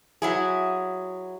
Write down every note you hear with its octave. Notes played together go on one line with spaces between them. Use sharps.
F#3 E4 G#4